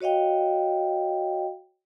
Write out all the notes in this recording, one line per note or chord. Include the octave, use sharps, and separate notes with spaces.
F#4 C#5 D#5 F5 G5